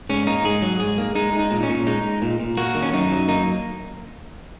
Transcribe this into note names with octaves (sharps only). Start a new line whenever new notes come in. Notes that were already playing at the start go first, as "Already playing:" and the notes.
G#2 C#4
A#3 D#4
G#2 G#4
F#3
G#2 G#4
A#3
G#3 D#4
G#3
D#4
A#2
C#4
A#2
G#3 D#4
G#3
A#2
A#2
A#3 F#4
D#3
C#4
F#2 D#4
F#3
A#3 D#4